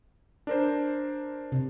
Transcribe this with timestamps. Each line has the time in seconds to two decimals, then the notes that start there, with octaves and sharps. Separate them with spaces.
0.47 D4 A#4 C5
1.52 C3